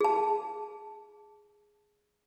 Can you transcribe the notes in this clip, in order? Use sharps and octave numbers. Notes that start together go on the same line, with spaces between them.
G#4 A5